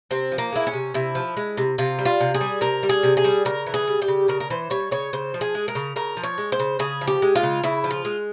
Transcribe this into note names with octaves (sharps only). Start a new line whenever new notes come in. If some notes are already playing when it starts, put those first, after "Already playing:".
C3 C4
F3
A#3
G#3 E4
C#4
C3
C3 E4
F3
G#3
C3
C3 F4
G3
F4
C3
G#4
G3
C3 A#4
G3
G#4
C3
G#4
G3
C#3 A#4
E3
G#4
G3
G4
C#3
C#3 A#4
A#4
E3 C5
G3 C#5
C#3 C#5
C#3 C5
F3
G#4
G#3
A#4
C#3
C#3 A#4
F3
C#5
G#3
C5
C#3
C#3 G#4
F3
G4
G#3
F4
C#3
C#3 E4
F3
F4
G#3